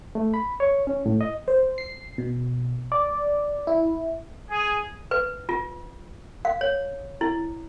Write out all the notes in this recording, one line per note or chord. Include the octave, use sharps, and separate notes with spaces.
A3
B5
C#5
C#4
A2
D#5
C5
C7
B2
D5
E4
G#4
B4
F4
F5
C#5
E4